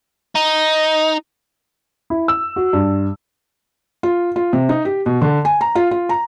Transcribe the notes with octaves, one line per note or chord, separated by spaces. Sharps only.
D#4
E4
E6
F#4
G2
F4
F4
C3
D#4
G4
B2
D3
G#5
A#5
F4
F4
A#5